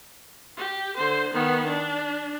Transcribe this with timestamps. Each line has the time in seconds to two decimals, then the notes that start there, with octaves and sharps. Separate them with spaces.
0.57 G4
0.96 D3 C5
1.33 D#3 B3
1.67 D4